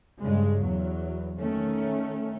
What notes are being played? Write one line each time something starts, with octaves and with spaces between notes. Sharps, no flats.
G2 C#3 G#3
E2 F#3
D#3 A3 C#4